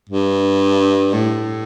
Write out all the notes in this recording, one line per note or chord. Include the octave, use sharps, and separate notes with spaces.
G2
A2